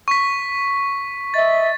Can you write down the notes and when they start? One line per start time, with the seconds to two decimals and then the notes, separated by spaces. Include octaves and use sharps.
0.08 C#6 B6
1.34 D#5 E5 A6